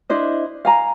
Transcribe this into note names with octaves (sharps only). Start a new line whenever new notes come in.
D4 E4 C5 D#5
F5 G#5 A#5